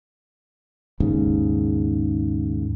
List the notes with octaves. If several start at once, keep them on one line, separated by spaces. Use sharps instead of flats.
G#1 D#2 G#2 C#3